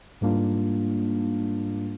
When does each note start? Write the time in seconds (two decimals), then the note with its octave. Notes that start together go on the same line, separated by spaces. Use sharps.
0.21 G#2 G3 A#3 D4 F4